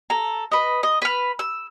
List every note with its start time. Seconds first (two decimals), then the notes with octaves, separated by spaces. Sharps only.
0.10 A4 A#5
0.52 B4 D#5
0.83 D#5
1.02 B4 F6
1.39 E6